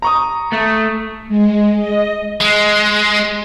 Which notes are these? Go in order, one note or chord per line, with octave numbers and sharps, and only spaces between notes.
A#5 C#6 D#6
A3
G#3
D#5
G#3